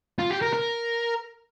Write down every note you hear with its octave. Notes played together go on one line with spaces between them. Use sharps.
F4
G4
A#4
A#4